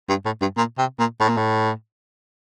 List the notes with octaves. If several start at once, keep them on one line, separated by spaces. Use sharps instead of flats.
G2
A2
G2
A#2
C3
A#2
A2
A#2
A2